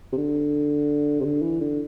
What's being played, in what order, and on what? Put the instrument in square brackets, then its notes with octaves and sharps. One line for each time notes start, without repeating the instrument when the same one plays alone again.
[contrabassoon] C3
D3
C3
D3
E3
D3